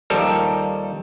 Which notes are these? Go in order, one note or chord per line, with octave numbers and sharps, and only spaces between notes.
D#2 F3 G3 A4 A#4